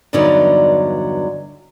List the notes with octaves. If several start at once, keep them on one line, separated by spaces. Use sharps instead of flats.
E2 G2 D3 F#3 D#4 D5